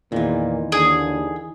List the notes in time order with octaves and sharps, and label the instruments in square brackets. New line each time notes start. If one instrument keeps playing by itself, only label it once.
[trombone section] E2 [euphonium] A#2 [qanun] D#3 E3
[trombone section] D#2 [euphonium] D3 [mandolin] G#4